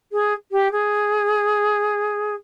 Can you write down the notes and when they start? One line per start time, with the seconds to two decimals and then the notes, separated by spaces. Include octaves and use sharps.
0.12 G#4
0.51 G4
0.71 G#4